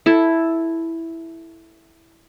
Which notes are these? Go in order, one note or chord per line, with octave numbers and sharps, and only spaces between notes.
E4 A4